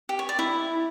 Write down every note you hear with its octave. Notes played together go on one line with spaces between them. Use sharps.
G4
C#5
D5
E4